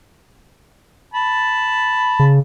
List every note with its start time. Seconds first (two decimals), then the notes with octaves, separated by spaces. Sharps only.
1.14 A5 B5
2.19 C#3